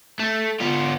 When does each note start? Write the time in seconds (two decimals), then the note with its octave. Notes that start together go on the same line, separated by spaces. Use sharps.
0.20 A3
0.61 B3 F4